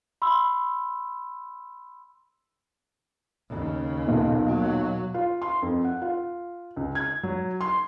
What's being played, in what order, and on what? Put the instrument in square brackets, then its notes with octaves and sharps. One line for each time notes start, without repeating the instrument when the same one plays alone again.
[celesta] B5 C6 E6
[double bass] D#2 C#3
[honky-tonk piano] B1 A#2
[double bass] F#3
[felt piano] F4
C6
F2
F#5
F4
C#2
G#6
F#3
C6